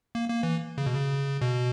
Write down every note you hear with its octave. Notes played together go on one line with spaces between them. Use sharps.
A#3
A#3
E3
C#3
B2
C#3
B2